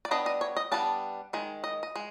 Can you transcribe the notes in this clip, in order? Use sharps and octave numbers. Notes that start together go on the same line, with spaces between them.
D5
G3 B3 D4 D#5
D#5
C#5
D#5
G3 B3 D4 A5
D#3 G#3
D#5
D#5
G#3